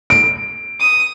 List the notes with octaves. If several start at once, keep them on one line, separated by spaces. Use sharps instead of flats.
D7
D#6